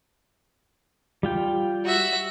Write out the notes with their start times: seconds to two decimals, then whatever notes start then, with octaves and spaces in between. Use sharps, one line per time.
1.23 G3 F4 G5
1.85 F#4 E5